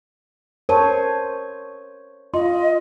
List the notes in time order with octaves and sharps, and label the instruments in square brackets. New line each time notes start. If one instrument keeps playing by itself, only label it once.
[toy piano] A#4 A5 [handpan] C5 C#5
[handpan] F4 [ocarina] D#5 [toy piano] C6